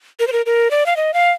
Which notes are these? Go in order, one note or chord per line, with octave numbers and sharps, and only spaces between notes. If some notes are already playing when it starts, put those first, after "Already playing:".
A#4
C5
A#4
A#4
D5
F5
D#5
F5